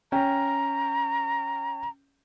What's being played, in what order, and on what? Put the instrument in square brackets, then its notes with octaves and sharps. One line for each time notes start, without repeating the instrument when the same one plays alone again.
[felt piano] C#4 G5 [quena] A#5